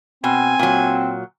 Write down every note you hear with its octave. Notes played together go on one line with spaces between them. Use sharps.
B2 C4 G#5
A#2 F#3